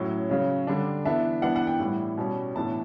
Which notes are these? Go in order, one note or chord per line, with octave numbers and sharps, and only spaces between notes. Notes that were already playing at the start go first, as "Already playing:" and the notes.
Already playing: A2 F#3 C#4
C#3 F#3 C#4
D3 G3 D4
E3 B3 D4 E5
E3 B3 D4 F#5
F#5
G5
A2 E3 G3
B2 G3 C#4
A2 E3 B3 D4 A5